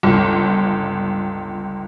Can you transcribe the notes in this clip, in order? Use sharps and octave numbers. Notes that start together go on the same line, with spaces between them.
G1 C#2